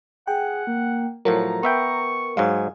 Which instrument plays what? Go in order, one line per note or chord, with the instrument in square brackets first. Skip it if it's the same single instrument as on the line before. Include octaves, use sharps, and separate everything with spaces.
[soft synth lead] G#4 [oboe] F#5 [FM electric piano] G5
[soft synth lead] A#3
[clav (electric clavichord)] A2 F3 F#3 [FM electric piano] A#4 [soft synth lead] A#5
[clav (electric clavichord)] B3 E5 G5 [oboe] C#6
[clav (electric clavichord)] G#2 F#3 G#3 [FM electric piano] F5 [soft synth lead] G#5